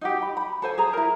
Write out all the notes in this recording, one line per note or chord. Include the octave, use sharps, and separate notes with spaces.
D#4 F#4 G4
B5
B5
A4 C5 G#5
G#4 A#5
E4 A#4